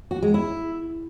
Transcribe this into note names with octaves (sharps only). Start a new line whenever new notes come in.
F#4
G#3
E4